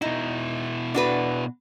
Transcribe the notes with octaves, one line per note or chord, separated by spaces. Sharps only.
B2 D#4 E4
D4 F#4 B4